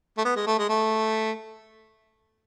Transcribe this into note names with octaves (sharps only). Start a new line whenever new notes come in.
A3
B3
G#3
A3
G#3
A3